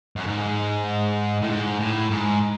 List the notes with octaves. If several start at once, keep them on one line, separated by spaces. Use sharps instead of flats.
F#2
G#2
A2
G#2
A2
G#2